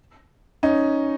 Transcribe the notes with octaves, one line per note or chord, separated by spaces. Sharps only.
C#4 D#4